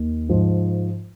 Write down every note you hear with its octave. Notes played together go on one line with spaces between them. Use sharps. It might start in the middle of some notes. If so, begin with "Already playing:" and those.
Already playing: D#2 D#3
G#2 F3